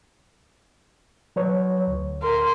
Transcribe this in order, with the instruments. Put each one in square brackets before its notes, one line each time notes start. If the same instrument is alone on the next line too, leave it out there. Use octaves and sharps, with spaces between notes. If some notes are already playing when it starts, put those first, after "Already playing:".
[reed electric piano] F#3 B4 C#5
D2
[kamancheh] A#4 C6